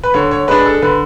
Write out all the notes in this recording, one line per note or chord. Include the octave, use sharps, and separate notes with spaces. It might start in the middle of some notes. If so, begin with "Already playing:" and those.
B4
D3 C#5
C#5
G#3 D4 B4
A4
D3 B4